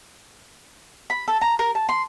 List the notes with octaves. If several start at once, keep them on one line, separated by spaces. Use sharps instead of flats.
B5
A4
A#5
A#4
A5
C6